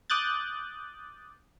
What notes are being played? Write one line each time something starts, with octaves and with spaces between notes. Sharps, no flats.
D6 D#6 F#6 G6 A6